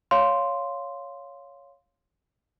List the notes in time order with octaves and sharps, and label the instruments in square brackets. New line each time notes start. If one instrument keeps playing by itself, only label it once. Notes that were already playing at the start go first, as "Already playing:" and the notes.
[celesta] C#5 F5 C6